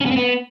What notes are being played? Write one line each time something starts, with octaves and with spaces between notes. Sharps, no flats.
C#4
B3
C4
B3